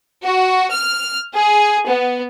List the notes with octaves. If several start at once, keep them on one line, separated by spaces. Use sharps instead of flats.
F#4
F6
G#4
B3